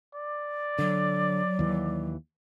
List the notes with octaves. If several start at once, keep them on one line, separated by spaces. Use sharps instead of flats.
D5
D3 F#3
D#2 E3